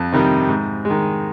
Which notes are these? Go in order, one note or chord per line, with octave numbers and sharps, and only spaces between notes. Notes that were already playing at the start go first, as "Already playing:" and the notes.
Already playing: F2 A5
C3 D#3 G3
G#2
G#3
D#3